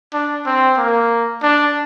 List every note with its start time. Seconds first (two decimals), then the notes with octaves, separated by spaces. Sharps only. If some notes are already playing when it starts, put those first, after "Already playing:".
0.13 D4
0.46 C4
0.78 A#3
1.43 D4